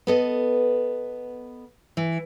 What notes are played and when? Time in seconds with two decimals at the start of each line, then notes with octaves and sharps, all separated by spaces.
0.07 B3 A4 D#5
1.97 E3